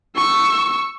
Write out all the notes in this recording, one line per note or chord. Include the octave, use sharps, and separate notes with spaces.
C#6 E6